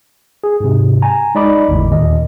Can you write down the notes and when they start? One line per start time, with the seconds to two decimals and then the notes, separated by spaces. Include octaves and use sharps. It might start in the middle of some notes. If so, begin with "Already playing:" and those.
0.44 G#4
0.60 G#2 C3
1.02 G#5 A#5
1.35 G#3 D#4 D5 D#5 B5 D6
1.69 G#1 E2 A2 D3
1.90 D#2 A#2 D#3 D#5